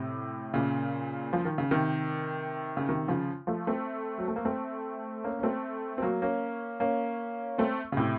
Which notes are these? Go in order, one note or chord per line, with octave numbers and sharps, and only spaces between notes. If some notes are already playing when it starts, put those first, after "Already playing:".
Already playing: A2 C3
A#2 C#3
F3
D#3
C#3
C3 D#3
C#3
C3 D#3
C#3 F3
F3 A3
A3 C4
F#3
A3
A#3
A3 C4
A#3 C#4
C#4
A3 C4
C4
F#3 A#3
A#3 C#4
A#3 C#4
A3 C4
C#3
A2 C3